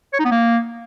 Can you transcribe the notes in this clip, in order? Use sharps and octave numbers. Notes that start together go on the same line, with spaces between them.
C#5
D#4
B3
A#3